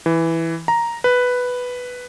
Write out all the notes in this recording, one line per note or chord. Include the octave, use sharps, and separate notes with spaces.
E3
A#5
B4